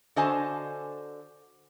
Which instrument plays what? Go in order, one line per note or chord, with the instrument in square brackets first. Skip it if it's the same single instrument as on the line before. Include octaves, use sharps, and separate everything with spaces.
[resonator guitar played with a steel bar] D3 F#4 C5 D#5 G#5 A5